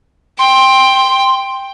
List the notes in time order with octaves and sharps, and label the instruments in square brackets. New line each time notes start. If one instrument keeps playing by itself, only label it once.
[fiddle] G5 [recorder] C6